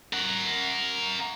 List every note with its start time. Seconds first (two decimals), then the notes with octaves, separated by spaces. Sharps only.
0.13 A#4 F#5